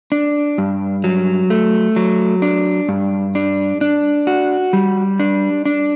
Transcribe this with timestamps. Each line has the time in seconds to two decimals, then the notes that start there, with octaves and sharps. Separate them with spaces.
0.12 D4
0.58 G2
1.04 F#3
1.50 A3
1.96 F#3
2.42 D4
2.89 G2
3.35 D4
3.81 D4
4.27 F#4
4.73 G3
5.20 D4
5.65 D4